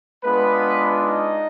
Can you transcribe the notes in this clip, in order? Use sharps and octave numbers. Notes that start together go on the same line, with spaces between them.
G#3 B3 D4 F4 B4
D#4 D#5